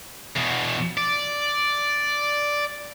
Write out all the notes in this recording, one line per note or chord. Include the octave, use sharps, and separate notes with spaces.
E2 B2
D5